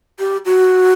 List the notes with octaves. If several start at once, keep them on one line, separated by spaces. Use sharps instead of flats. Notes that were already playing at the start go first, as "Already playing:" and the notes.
G4
F#4